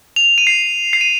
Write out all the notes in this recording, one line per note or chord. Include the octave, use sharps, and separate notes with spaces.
F7
D#7
C7
C7
D#7